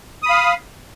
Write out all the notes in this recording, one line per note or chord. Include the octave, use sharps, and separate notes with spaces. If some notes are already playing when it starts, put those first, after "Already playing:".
F5 B5 D#6